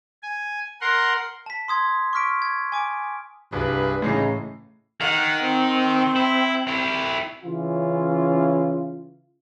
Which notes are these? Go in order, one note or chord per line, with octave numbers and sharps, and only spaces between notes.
G#5
A#4 F#5 C6
A5 B6
C6 D#6 G#6
C#6 D6 F6 B6 D7
G#6
G#5 D6 D7
C2 G2 F3 G#4 B4
A2 C#3 E3 C#4 D#4 C7
D#3 F#5
C4
E4
E4 G4
C#3 E3 C#4 F4